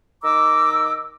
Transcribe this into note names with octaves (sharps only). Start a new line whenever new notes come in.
D#3 D#5 A#5 D6 E6